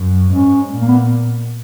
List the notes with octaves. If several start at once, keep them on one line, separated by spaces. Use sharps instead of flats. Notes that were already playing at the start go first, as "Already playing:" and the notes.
Already playing: F#2
G#2 C#4
A#2
A#3
B3